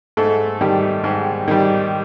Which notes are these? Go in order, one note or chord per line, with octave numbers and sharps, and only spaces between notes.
G#2 A3
D#3 G3
G#2
D#3 G3